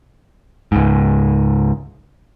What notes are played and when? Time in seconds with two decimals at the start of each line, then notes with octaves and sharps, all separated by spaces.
0.72 C#2 G#2